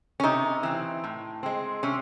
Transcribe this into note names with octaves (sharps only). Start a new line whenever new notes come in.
C#4
C3 D#4
E3 C4
A2
G#3 C4
C3 C#4